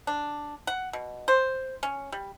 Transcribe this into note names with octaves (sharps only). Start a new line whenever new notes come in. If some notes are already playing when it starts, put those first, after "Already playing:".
D4
F#5
B2
C5
C#4
G3